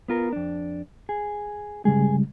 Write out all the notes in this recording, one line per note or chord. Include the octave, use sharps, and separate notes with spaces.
B3 F4 A#4
F2 D4
G#4
G2 C#3 G3 G#3 G#4